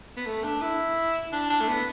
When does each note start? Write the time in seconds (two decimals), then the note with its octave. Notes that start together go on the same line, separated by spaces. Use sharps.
0.17 B3
0.26 A3
0.44 D4
0.62 E4
1.33 D4
1.50 D4
1.61 A3
1.68 B3